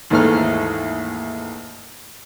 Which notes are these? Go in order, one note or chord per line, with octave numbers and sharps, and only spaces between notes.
D#2 G#2 E3 A3 A4 F6